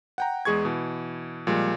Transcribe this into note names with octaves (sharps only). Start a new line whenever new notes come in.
F#5 G5 A#5
E2 G#3 G#4 C#6 G#6
B2 E3
A#2 F3 G3 G#3